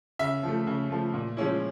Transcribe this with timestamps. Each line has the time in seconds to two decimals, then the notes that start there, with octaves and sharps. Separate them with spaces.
0.19 C#3 E5
0.43 F3 A3
0.67 C#3
0.90 F3 A3
1.14 A#2
1.37 F3 G#3 C#4 E4